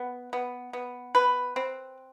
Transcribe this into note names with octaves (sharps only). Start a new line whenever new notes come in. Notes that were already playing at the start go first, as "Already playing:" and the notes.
Already playing: B3
B3
B3
B4
C4